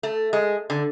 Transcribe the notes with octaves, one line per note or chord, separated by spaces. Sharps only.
A3
G#3
D3